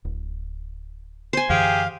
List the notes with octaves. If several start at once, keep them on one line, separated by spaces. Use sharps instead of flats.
D1
C5 G#5
F#2 D3 E3 G4 G#4 F5